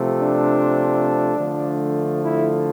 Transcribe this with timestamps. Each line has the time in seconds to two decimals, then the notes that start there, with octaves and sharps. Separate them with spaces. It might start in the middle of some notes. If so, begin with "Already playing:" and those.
Already playing: C3 F3 A3
0.21 D4
1.36 D3 F3 A3
2.23 E4